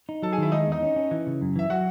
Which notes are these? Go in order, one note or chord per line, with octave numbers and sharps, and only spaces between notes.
D#4
F#3 A4 A5
G#4 G#5
D#3 E4 E5
G#3 D#4 D#5
E2
D#4 D#5
C#4
C#4
E3
C#3
F#2
E3 E5
F#3 F#4 F#5